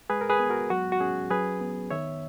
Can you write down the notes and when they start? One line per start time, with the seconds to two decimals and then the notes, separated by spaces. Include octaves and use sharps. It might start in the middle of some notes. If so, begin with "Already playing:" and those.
0.10 G#3 G#4 B4
0.21 A#4
0.30 G#4 B4
0.40 B3
0.50 F#4 A#4
0.70 F#3 F#4
0.92 F#4
1.00 C#4 G#4
1.30 F#3 G#4 B4
1.61 B3
1.91 D#3 C#5 E5